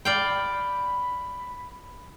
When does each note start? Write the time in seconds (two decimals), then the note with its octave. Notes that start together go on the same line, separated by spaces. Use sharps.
0.05 D5 F5 G5 B5